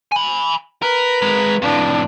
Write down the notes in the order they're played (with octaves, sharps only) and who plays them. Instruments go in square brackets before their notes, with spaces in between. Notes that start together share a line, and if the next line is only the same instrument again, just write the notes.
[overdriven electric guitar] G#5 B5
[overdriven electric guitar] A#4 [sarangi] B4
[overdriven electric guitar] G#3 A#4
[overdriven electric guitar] F2 A2 [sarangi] D4